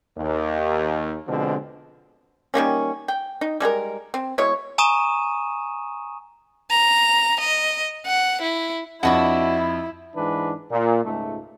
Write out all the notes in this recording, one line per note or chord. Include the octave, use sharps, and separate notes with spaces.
D#2
B2 D3 F3 G#3 C4
D#3 G3 A#3 C#4
G5
D#4
G3 G#3 F#4 A#4
C4
B2 G#3 E4 C#5
G#5 A#5 C#6 D#6 D#7 E7
A#5
D#5
F#5
E4
F2 D4 E4 F#4 D#5 F#5 B5
G#2 E3 D4 B4
A#2
C#2 G#2 A3